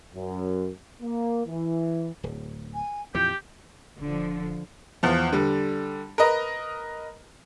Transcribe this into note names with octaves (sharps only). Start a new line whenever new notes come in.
F#2
A#3
E3
D1
G#5
F2 A#2 E3 G4 G6
D#1 D3 F3
E2 F3
D3 G3
A#4 B4 D#5 A#5